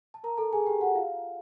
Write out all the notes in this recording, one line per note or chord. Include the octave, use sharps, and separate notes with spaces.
A5
A#4 A#5
A4 A5
G#4 G#5
G4 G5
F#4 F#5
F4 F5